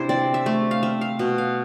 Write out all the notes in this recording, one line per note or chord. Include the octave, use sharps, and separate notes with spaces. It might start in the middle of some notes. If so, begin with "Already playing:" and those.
Already playing: C3 D4 E4 C5
C4 D5
E5
A3
F5
C4 E5
F5
B2
F5